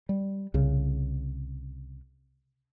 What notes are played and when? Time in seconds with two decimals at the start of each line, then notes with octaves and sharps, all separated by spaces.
0.09 G3
0.54 C2 C#3